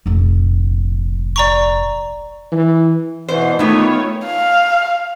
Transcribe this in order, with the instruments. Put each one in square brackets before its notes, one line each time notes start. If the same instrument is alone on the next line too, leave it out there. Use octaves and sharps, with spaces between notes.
[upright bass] F1 A#1
[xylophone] D5 A#5 C#6
[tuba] E3
[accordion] B2 E3 [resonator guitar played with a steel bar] C5
[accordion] D#3 [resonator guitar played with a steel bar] E3 B3 [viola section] A3 C#5 [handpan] D#4 F4
[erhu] F5